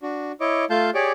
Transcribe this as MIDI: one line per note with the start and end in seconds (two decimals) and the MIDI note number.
0.02 0.32 62
0.02 0.32 66
0.40 0.65 64
0.40 0.65 73
0.40 0.65 75
0.40 0.65 86
0.70 0.90 57
0.70 0.90 65
0.70 0.90 77
0.70 0.90 81
0.70 0.90 91
0.94 1.12 67
0.94 1.12 68
0.94 1.12 73
0.94 1.12 74
0.94 1.12 86